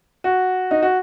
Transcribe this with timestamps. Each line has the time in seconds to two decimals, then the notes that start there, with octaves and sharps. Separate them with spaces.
0.24 F#4
0.71 D#4
0.82 F#4